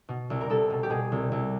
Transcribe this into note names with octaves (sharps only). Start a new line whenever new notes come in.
B2
C2
A#4
C2 A4
B2
G4
B2 G#4
C2
C2